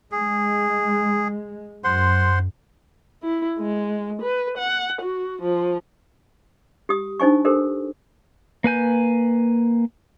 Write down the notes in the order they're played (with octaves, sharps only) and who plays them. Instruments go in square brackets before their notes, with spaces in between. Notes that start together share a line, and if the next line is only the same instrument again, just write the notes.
[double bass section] G#3 [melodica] G#4
[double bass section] F#2 [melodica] C5 F#5 C6
[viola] E4
G#3
B4
F#5
F#4
F3
[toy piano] G4 D#6
D4 D#4 C5 G#5 C#6
G4 A4 A#4 C5
[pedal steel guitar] A#3 B4 G#5 G6